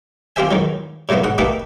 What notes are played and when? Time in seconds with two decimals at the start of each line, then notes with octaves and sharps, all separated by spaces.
0.36 C4 F4 G4 C5 E5 G#5
0.51 E2 D#3 F#3
1.09 A2 C3 F#3 A#3 B3
1.24 G#2 F#5
1.38 A3 A#3 D#4 G4 A4 B4